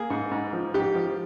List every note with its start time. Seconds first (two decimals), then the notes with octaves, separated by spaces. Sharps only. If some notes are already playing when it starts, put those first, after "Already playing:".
Already playing: A#3 G#4
0.10 G#2
0.31 G#2
0.53 F3
0.74 G#2 G4
0.95 F3